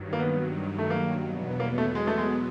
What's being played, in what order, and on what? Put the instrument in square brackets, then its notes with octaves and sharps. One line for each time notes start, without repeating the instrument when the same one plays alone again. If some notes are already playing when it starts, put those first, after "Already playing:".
Already playing: [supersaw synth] G2 D#3 F#3
[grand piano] A#3
B3
A3
A#3
[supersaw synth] E2 B2 F#3 B3
[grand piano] A#3
A3
G#3
A3
G#3